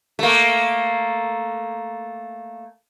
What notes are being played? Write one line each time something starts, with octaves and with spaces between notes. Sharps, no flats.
A3 A#3